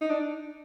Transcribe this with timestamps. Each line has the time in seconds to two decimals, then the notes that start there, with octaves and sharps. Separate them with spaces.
0.01 D#4
0.09 D4